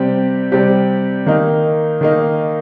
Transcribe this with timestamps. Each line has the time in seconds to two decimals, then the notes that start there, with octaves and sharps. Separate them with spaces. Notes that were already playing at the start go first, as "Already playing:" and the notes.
Already playing: C3 G3 C4 G4
0.52 C3 G3 C4 G4
1.26 D#3 A#3 D#4
2.01 D#3 A#3 D#4